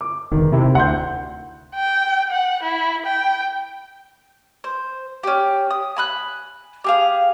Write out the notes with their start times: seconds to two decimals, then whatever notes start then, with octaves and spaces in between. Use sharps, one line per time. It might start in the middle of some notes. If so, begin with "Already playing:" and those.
0.01 D6
0.32 E1 D#3
0.52 C3 E4
0.75 D2 F#5 C6 G6
1.75 G5
2.30 F#5
2.63 E4
3.06 G5
4.64 C5
5.23 C#4 G4
5.71 D#6
5.96 G#5 B5 F#6
6.84 G4 G#4 F5